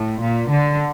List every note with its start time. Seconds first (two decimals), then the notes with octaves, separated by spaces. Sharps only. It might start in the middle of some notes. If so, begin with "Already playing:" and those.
Already playing: A2
0.21 A#2
0.51 D3